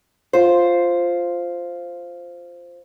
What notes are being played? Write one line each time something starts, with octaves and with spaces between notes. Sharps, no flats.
F4 C5